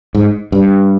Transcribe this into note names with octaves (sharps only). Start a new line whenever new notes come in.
G#2
G2